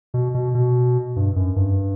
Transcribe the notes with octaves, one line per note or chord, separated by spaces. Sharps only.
B2
B2
B2
G2
F#2
G2